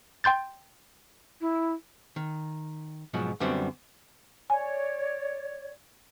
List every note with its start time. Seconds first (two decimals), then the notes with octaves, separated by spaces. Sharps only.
0.24 G5 C6 G6 A6
1.41 E4
2.16 D#3
3.14 G#2 B2 F3 F#3
3.40 F#2 D3 G3 B3 C4 F#4
4.50 C#5 D5 G#5